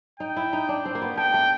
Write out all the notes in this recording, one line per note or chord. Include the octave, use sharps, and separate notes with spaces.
D#4 G5
E4
D#4
D4
C4
A#3
B3
A3 G5
A3